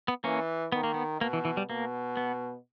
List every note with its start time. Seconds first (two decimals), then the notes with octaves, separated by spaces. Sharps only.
0.08 B3
0.24 E3 A#3 C#4
0.72 D#3 B3
0.84 A#3
0.94 B3
1.21 B2 A#3
1.33 E3
1.45 E3
1.57 G3
1.69 B2 A#3
2.17 B3